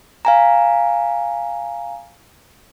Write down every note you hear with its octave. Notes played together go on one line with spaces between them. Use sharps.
F5 G#5 A#5